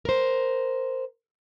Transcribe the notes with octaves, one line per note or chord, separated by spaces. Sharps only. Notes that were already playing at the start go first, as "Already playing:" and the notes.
A#4 C5